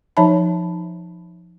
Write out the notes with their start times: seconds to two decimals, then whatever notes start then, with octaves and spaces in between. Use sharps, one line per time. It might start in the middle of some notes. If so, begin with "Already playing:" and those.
0.17 F3 D#4 C#5 E5 A5 B5